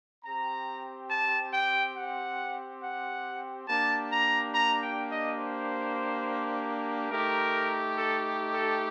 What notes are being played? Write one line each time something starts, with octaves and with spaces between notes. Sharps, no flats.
C4 G4 A#5
A5
G5
F#5
F#5
A#3 D4 G4 A5
A#5
A#5
G5
D#5
C5
A3 D#4 G4 A#4
A4
A4